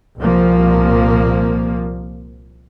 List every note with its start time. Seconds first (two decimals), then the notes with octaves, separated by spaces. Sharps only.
0.19 C2 A#2 F3 A#3